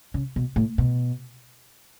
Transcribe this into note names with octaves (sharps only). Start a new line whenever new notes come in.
C#3
B2
A2
B2